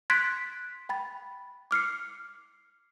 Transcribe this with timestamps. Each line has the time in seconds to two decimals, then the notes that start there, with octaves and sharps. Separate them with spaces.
0.10 C6 F#6 G#6 A6 B6 D7
0.89 G5 B5 A6
1.71 D6 F6 C7 C#7